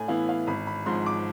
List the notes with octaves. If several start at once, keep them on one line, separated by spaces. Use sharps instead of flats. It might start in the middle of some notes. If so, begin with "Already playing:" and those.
Already playing: A2 G#5
E3 B3 E4 F5
F5
G#1 B5
B5
G#2 F3 C6
D6